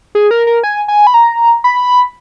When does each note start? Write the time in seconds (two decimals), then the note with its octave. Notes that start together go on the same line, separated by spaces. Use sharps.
0.15 G#4
0.31 A#4
0.47 A#4
0.63 G#5
0.88 G#5
1.07 B5
1.14 A#5
1.64 B5